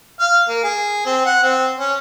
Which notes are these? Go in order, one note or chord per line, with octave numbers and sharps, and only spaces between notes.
F5
A#3
G#4
C4
F#5
C4
C#4